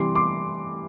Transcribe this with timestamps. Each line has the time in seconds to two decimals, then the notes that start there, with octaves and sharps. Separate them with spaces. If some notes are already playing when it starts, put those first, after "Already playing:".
Already playing: C3 E3 G3 C6 D6
0.15 C6 D6